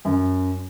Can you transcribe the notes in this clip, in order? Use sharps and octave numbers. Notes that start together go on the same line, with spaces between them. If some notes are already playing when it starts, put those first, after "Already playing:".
F#2